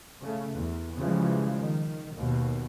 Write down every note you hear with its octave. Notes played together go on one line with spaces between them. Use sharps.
C#3 A3
E2
C#3 E3 F3 G3 G#3
D#3
D#2 B2